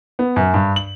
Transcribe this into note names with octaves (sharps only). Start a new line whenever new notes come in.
B3
F#2
G2
F#7